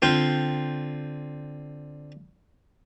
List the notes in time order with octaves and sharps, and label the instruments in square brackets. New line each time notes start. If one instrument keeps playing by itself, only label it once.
[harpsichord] D3 C4 F4 G5